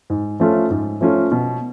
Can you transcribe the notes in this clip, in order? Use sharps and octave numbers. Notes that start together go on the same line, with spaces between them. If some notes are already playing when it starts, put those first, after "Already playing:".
G#2
F3 A3 C#4 F4
G#2
F3 A3 C#4 F4
B2